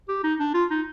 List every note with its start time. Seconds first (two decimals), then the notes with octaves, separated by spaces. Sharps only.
0.08 G4
0.24 D#4
0.39 D4
0.54 F4
0.70 D#4